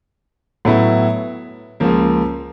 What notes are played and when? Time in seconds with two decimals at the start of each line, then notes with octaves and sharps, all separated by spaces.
0.65 A2 F#3 B3 E4
1.80 C#2 C#3 F3 A#3